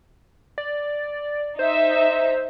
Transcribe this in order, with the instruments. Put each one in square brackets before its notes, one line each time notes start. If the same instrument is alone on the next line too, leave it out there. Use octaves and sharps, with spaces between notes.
[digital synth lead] D5
[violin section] D#4 E5 [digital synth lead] C5